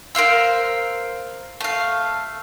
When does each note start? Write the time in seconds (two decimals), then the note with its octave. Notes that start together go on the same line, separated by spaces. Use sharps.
0.15 A#4 C5 F5 E6
1.61 A3 F5